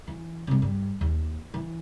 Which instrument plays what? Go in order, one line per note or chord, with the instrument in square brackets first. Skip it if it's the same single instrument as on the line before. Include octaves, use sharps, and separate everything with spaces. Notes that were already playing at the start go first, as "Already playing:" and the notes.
[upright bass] E3
C3 G#3
G2
D#2
E3